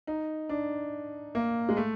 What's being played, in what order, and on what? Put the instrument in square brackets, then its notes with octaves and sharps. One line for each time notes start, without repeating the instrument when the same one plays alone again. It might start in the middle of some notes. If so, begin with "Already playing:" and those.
[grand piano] D#4
D4
A#3
G#3
A3